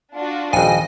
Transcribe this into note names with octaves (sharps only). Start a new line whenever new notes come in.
D4 F4 F#4
D#1 G#1 F2 F3 D#5 G#5